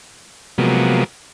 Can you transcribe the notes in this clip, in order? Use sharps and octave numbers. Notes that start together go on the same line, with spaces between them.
C3 F3 F#3 G#3 A#3 B3